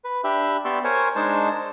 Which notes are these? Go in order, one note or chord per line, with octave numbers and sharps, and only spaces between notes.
B4
D4 G4 E5 B5
B3 G4 D5 C6 C#6 E6
A#4 C5 C#5 G#5 C#6
G#3 D4 D#4 C5 A5